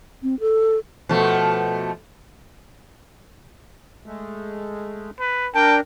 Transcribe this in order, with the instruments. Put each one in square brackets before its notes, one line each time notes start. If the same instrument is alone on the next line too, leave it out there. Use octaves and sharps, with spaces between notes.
[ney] C4
A4
[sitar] B2 F3 A3
[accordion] G#3 A3
[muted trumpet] B4
[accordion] D4 A#4 [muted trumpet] G5 [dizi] A5